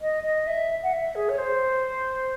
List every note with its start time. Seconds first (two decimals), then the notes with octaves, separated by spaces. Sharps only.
0.01 D#5
0.24 D#5
0.47 E5
0.83 F#5
0.93 E5
1.15 G#4
1.29 C#5
1.38 C5